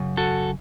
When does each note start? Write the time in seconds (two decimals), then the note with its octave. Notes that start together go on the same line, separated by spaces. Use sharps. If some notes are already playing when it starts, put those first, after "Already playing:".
Already playing: F#2 C#3
0.17 F#4 A4